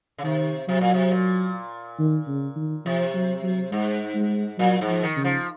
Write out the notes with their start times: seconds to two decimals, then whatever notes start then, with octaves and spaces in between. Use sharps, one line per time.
0.18 C#3
0.24 C3 D#3
0.69 C3 F#3
0.81 A#2
0.94 C3
1.11 A#2
1.99 D#3
2.28 C#3
2.56 D#3
2.85 C3 F3
3.14 F#3
3.43 F#3
3.71 G#2 G#3
4.15 G#3
4.58 A#2 F#3
4.81 G#2
4.87 F3
5.03 D#3
5.16 C#3
5.24 F3